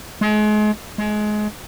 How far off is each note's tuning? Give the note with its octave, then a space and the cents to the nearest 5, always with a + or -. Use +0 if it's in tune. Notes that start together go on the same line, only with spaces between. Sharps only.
G#3 +35
G#3 +25